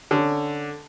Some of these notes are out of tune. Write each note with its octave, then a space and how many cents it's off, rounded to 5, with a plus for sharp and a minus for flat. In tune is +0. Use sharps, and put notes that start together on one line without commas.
D3 +0 C#4 +0